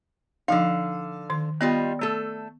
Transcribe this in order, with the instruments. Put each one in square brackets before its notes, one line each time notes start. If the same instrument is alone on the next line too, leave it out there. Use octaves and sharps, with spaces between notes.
[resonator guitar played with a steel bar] D3 F5 [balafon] F3 D#4
[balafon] D#3 C6
[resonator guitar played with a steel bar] G3 F4 D#5 [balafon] B3
[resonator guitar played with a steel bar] A3 A4